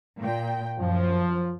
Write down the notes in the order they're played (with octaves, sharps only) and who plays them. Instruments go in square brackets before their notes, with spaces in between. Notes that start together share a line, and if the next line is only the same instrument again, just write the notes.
[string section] A#2 G5
[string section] F#2 [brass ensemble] F3